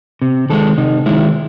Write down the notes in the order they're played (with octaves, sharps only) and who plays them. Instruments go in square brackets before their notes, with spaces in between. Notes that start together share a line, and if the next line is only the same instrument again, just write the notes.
[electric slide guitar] C3
D#3 G#3 A4
C3 D#4
D#3 G#3 E4